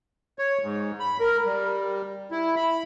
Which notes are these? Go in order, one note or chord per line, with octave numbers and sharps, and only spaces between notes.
C#5
G#2
B5
A#4
G3
E4
B5